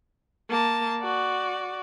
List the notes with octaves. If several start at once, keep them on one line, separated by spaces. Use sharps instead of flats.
A#3 A5
F#4 D5